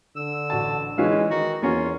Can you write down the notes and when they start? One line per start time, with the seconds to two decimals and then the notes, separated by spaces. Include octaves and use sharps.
0.16 D3 E6
0.50 A1 F#4 A5
0.98 E3 G#3 C#4 B4 F5
1.31 D#3 D#4 F#4
1.62 E2 A#3 C#4 F4 F#4